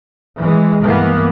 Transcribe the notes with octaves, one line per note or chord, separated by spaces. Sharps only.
E3 G#3
G2 E3 A#3 B3